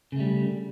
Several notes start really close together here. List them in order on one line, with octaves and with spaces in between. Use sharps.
C#3 A3 G3